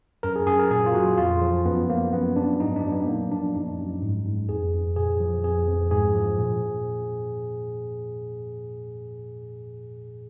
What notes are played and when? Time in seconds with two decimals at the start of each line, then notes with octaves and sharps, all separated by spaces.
0.23 F#2 A#4
0.36 G#4
0.47 F#2 G#4
0.59 A#4
0.71 A#2 G#4
0.86 F4
0.95 F#3 F#4
1.18 F2 F4
1.41 F3
1.65 F#2 B3
1.89 F3 A#3
2.12 F#2 B3
2.36 F#2 D4
2.60 G#2 D#4
2.76 D4
2.84 F#3
2.92 B3
3.07 A#2 A#3
3.31 F3 D4
3.54 F#2 D#4
3.78 F#2
4.02 G#2
4.25 G#2
4.49 F2 G#4
4.74 F2
4.96 A#2 G#4
5.20 F3
5.44 F2 G#4
5.68 F2
5.91 G#2 G#4
6.15 F3
6.38 A#2